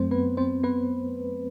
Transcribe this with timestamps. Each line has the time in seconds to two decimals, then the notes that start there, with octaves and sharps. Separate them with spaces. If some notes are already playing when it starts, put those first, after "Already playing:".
Already playing: F#2 F#3 A3 C4 C5
0.11 B3 B4
0.37 C4 C5
0.63 B3 B4